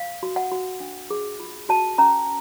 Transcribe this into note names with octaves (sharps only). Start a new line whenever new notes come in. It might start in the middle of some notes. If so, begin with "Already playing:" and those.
Already playing: F5
F#4
F#5
F#4
D4
G#4
F4
F#4 A5
C#4 A#5